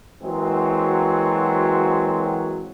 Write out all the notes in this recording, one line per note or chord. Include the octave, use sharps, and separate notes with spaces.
E3 F#3 G#3 A#3 C4 F#4